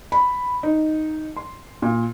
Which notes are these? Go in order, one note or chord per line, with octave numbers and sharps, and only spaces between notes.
B5
D#4
C6
A#2